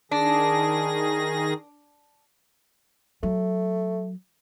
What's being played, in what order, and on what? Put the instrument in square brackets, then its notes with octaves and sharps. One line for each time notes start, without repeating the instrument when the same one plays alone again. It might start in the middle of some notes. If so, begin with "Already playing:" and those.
[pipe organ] D#3 G#4 A#6 [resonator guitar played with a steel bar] D4
[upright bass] F#3 [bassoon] A3